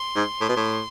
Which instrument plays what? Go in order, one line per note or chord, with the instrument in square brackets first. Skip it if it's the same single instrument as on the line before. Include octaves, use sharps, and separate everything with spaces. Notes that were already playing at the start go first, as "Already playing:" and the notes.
Already playing: [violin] C6
[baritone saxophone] G#2
A2
B2
A2